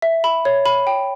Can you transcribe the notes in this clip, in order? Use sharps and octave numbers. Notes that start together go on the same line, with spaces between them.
E5
B5
C#5
B5
G5